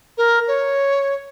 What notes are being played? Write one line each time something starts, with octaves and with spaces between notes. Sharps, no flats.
A#4
C#5